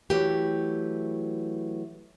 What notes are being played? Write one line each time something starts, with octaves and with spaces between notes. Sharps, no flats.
E3 F#3 A3 G4